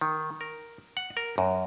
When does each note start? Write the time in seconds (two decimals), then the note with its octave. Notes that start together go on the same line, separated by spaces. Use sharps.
0.01 D#3
0.41 A#4
0.97 F#5
1.17 A#4
1.38 F#2